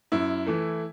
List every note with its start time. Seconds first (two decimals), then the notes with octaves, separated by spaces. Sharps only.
0.12 F#2 E4
0.47 E3 A3